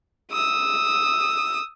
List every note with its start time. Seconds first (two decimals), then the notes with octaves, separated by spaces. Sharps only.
0.32 D#6 E6